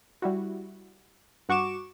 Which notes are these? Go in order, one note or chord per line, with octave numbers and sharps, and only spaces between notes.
G3 E4 F#4
G2 F#4 C#6 D6 E7